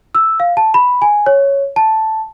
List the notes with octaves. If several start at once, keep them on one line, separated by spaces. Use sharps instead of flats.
E6
F5
A5
B5
G#5
C#5
A5